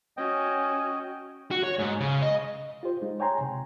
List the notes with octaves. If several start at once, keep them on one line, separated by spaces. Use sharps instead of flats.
C#4 F#4 D#5 G5
F#4
C#5
G#2
C#3
D#5
F4 G4 C5
G#3 D#4 G#4
C#5 G5 G#5 A#5 C6
C3